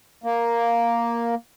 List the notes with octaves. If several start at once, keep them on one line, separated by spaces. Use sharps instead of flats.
A#3